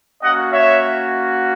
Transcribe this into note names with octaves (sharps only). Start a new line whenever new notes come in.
A#3 C#4 F#4 D#5 F#5
C#5 E5